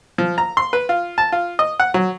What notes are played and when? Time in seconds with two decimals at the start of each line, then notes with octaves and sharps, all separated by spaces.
0.18 F3
0.38 A#5
0.57 C6
0.73 B4
0.89 F4
1.18 A5
1.32 F4
1.59 D#5
1.80 F#5
1.94 F#3